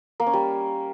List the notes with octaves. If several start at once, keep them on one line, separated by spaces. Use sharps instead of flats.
A#3
C#4
G3